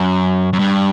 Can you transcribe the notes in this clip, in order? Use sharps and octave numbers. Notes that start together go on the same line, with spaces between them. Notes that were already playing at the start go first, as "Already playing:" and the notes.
Already playing: F#2
F#2
G2